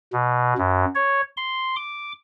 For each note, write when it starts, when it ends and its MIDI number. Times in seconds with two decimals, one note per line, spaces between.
0.13 0.54 47
0.58 0.85 42
0.95 1.21 73
1.37 1.76 84
1.76 2.12 86